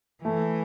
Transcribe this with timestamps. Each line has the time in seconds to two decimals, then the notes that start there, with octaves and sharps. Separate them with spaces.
0.24 E3 A3